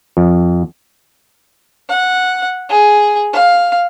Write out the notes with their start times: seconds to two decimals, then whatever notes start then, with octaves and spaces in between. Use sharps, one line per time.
0.17 F2
1.89 F#5
2.69 G#4
3.33 F5